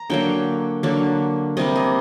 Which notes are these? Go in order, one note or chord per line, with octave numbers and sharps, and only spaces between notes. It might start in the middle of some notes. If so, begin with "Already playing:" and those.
Already playing: A#5
D3 F#3 A#3 G5
D3 F#3 A#3
C3 G3 A#3 D#5
D#5